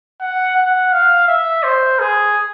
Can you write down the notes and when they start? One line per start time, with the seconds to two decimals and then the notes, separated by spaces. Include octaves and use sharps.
0.21 F#5
0.56 F#5
0.92 F5
1.28 E5
1.63 C5
1.99 G#4